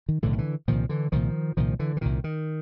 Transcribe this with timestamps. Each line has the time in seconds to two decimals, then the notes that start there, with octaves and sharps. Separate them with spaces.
0.09 D#3
0.22 B1 A2 D3 E3
0.33 D#3
0.38 D3 E3
0.68 C2 A#2 D#3 F3
0.89 D3 E3
1.12 C2 A#2 D#3 F3
1.57 C2 A#2 D#3 F3
1.79 D3 E3
1.97 E3
2.01 C2 A#2 D#3
2.24 D#3